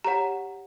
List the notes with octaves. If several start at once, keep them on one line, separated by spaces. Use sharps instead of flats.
G4 C#5 F#5 A#5